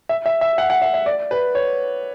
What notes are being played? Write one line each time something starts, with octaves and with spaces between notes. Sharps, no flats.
E5
E5
E5
F#5
F#5
E5
E5
D5
B4
C#5